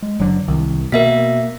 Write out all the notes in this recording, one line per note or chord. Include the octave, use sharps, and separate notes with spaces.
G#3
F#1 D3 F#3
C2 D#3
B2 A#3 A#4 E5 B6